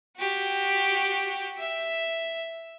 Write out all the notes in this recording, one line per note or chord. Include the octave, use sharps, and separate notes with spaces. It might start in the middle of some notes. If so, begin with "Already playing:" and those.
F#4 G4
E5